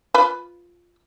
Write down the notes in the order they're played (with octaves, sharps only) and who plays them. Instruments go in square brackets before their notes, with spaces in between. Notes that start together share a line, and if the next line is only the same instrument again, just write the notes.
[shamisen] F4 B4